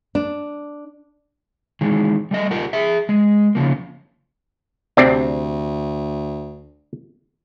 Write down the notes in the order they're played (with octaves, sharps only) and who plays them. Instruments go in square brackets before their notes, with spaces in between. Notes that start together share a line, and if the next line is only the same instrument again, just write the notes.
[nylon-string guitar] D4
[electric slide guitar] D#3 E3 G#3
G3 A3 D#5
F4 G4 A#4 F#5
G#4 E5
G#3
C#3 F3 A#3
[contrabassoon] D2 [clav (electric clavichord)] C3 C4 D4